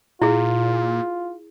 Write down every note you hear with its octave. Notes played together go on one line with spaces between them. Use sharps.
A#2 E4 F4 G#4